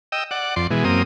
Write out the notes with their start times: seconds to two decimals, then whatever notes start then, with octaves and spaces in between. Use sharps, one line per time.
0.12 D#5 G5 E6
0.31 D5 F#5
0.56 F2 D5 C6
0.71 B2 E3 G#3
0.84 F#2 A#3 C4 D#6